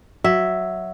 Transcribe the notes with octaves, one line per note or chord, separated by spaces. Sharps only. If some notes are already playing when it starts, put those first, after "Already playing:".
F#3 E5